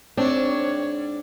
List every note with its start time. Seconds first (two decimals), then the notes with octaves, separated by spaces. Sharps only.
0.17 G#2 C4 D4 C#5